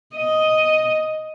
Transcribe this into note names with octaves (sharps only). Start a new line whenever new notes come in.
D#5